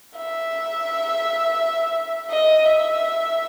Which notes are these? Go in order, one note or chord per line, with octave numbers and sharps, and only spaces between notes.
E5
D#5
E5